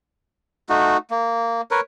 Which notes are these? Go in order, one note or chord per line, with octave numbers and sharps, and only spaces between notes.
A3 D#4 F#4
A#3
A#4 B4 C#5